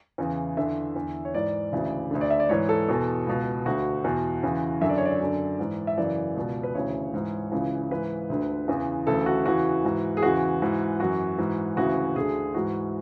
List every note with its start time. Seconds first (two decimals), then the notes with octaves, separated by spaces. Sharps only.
0.18 E2 C#3 E3
0.57 E2 D3 E5
0.96 E2 D3
1.25 C#5
1.34 G#2 E3 D5
1.72 D2 C#3 E3
2.11 D2 D3
2.21 D5
2.30 E5
2.40 D5
2.49 G#2 E3 C#5
2.69 A4
2.88 E2 B2
3.27 C#2 B2
3.66 D2 D3 F#4
4.04 E2 B2
4.43 E2 C#3 E3
4.81 F#2 D3 E5
4.89 D5
4.98 C#5
5.05 D5
5.20 F#2 D3
5.59 G#2 E3
5.87 E5
5.97 F#2 C#3 E3 D5
6.36 C#2 B2
6.63 B4
6.75 D2 C#3 E3 C#5
7.14 G#2 E3
7.52 C#2 C#3 E3
7.91 G#2 E3 B4
8.30 D2 D3
8.68 E2 C#3 E3
9.07 D2 C#3 E3 A4
9.26 F#4
9.45 E2 C#3 E3 F#4
9.83 G#2 E3
10.17 G#4
10.22 E2 C#3 E3 F#4
10.62 G#2 E3
11.00 F#2 E3 F#4
11.38 G#2 E3
11.76 D2 C#3 E3 F#4
12.16 D2 D3 G#4
12.54 G#2 E3 F#4